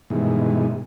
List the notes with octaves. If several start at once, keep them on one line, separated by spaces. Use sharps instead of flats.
G2 B2 D#3 E3 G#3